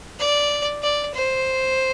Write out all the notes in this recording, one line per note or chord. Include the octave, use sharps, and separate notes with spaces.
D5
D5
C5